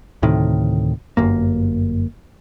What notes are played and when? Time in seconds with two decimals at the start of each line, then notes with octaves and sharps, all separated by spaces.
0.23 D2 A2 C3 D#3
1.17 G1 F#2 A#3